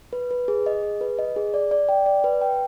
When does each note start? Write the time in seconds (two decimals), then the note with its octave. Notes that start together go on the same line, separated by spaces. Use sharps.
0.13 B4
0.31 B4
0.48 G#4
0.66 D#5
0.83 G#4
1.01 B4
1.19 D#5
1.36 G#4
1.54 D5
1.71 D5
1.89 G5
2.06 D5
2.24 B4
2.41 G5